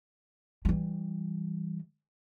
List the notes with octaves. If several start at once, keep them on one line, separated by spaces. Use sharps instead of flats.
E3 G3